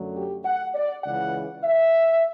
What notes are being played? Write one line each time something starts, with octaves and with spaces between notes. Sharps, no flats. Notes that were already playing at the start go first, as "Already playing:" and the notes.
Already playing: F#2 D3 F#3 A3
G4
F#5
D5
C#2 C#3 E3 F#5
E5